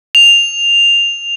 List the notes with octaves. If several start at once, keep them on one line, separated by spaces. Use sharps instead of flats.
F7